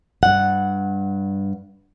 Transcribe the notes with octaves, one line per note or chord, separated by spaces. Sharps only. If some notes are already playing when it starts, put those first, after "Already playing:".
G2 F#5